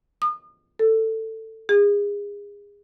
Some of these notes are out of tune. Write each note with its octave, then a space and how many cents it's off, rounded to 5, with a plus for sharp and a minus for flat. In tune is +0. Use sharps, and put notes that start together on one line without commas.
D#6 -35
A4 +15
G#4 -30